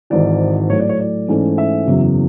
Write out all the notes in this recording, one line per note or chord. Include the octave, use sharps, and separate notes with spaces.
G#1 G#2 E3 D5
A2 F#3 A3 C#5
D5
C#5
D5
G#2 E3 A3 C#4
E5
F#1 E2 C#3 F#3